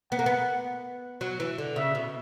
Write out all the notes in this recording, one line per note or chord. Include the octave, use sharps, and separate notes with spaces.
B3 F#5
A#3
B3
F#3
E3
D3
C#3 E5
B2